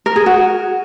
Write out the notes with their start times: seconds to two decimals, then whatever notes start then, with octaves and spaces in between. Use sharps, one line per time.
0.06 A#4
0.16 G#4
0.26 F#4